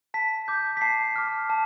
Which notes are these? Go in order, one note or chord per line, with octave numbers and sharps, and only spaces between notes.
A5 B6
D6 G6
B6
A5 C7
D6 F6
A5